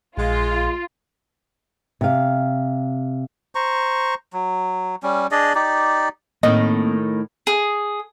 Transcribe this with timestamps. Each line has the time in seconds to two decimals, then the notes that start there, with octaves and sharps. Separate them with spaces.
0.18 A#1 G#3 F4
2.01 C3 F5
3.55 C5 A#5 C#6
4.33 F#3
5.03 G3 C#4
5.31 D4 G#4 D5 D#5
5.55 D#4 G4 D5
6.43 A2 D#3 A#3 C4 D#5
7.47 G#4